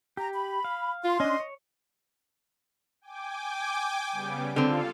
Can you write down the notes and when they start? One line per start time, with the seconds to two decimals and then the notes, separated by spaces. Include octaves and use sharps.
0.17 G4 A#5
0.33 B5
0.64 F5
1.04 F4 C6
1.20 C#4 D4 D#5
1.40 C#5
3.01 G5 G#5 D6
4.11 C#3 G3 B3
4.56 D3 C4 F4 A4 F5